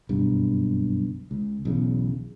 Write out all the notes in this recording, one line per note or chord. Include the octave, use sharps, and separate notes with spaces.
F#1 B1 G2
C#2
B1 E2 C#3